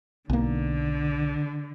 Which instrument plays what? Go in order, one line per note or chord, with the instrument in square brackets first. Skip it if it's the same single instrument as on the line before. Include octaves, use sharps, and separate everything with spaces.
[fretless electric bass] B1 A#3 [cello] D3